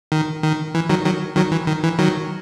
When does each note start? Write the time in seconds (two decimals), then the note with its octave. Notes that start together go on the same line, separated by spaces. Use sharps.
0.12 D#3
0.43 D#3
0.75 E3
0.89 D#3 F#3
1.04 D#3 F#3
1.36 D#3 F#3
1.51 E3
1.67 D#3
1.83 E3
1.99 D#3 F#3